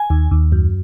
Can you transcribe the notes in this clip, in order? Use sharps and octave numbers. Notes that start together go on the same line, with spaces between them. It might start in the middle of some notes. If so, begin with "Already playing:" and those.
Already playing: G#5
D#2
D#2
F#2